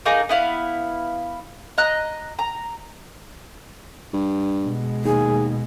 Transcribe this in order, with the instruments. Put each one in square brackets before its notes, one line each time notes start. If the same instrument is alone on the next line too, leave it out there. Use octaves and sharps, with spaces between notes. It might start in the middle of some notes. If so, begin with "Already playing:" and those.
[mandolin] A#3 D#4 G#4
B3 E4 F5
D#5 A#5 F#6
A#5
[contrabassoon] G2
[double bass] B2 G#3
[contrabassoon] D#2 [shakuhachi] G#4